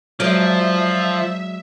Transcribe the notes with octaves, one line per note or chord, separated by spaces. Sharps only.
F3 F#3 G#3 D5 E5